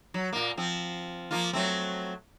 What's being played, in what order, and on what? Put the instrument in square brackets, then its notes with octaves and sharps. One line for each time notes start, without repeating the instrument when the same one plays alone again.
[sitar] F#3
A#2 A#3
F3 C4
F3 A#3 F4
F#3 A3 C4